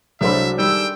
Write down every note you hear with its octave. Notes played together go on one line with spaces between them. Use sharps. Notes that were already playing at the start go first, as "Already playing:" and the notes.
C2 F#3 G#3 A3 D4 C5 E5 B5
D#3 G3 G5 E6